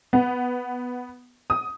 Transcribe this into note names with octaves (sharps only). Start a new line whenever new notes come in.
B3
D#6